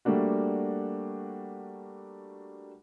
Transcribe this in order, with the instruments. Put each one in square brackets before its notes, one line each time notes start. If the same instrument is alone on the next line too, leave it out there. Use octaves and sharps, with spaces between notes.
[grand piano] G3 A3 A#3 D4 F#4